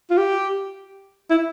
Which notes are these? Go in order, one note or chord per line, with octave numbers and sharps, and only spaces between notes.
F4
G4
E4